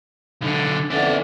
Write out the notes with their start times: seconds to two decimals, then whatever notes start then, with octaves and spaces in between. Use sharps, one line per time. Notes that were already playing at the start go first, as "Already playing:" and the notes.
0.42 B1 D3
0.91 F2 D3 E3 C#4 D5